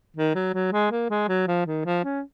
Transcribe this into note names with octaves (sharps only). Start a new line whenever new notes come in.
D#3
F#3
F#3
G#3
A#3
G#3
F#3
F3
D#3
F3
C#4